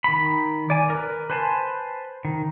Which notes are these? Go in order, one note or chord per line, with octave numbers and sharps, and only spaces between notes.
D#3 B5
D5 G#5
A#4 B4
B4 C5 G#5 A5 C6
D#3